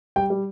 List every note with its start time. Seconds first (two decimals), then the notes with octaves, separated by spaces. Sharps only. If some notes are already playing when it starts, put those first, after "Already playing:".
0.16 G3 G5
0.30 G3